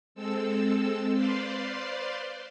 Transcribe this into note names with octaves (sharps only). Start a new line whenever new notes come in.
G#3 C4 A4 E6
B4 C5 D5 F5 C6